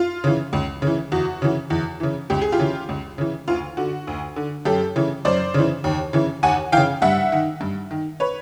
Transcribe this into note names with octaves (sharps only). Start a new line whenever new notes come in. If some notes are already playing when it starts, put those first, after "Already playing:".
Already playing: F4
C#3 E3
C#2
C#3 E3
E2 F#4
C#3 E3
E2
C#3 E3
C#2 G4
G#4
F4 G4
C#3 E3
C#2
C#3 E3
D2 F4
D3 F#4
D2
D3
F#2 G4 A4
C#3 E3
F#2 C5 D5
C#3 E3
D#2
C#3 E3
D#2 F#5 G#5
C#3 E3 F5 G5
G2 E5 F#5
D#3
G2
D#3
B4 C#5